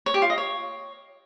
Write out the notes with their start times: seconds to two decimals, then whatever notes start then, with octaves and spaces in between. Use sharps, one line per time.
0.06 C#5
0.14 G4
0.22 F4
0.30 D#5
0.38 C#5